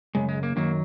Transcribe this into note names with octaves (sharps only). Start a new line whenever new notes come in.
F#2 C#3 G#3
G#3
A#3
F#2 D#3 F#3 A#3